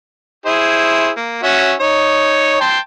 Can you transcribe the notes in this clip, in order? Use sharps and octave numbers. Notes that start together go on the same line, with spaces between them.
E4 G#4 C5
A#3
C#4 F#4 E5
D#4 C#5
G5 A5 C6